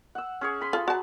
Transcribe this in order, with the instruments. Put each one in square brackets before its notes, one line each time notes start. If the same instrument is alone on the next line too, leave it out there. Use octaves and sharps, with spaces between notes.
[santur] F#5 E6
C#4 G#4 C#5
G#5 B5 C6
[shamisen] F4 A4
[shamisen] F#4 A5 [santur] A#5